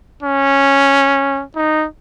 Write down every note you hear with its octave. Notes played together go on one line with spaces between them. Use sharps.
C#4
D#4